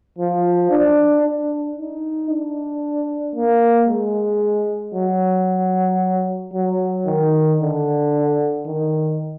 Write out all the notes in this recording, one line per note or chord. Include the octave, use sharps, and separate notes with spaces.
F3
D4
D4
D#4
D4
A#3
G#3
F#3
F#3
D#3
D3
D#3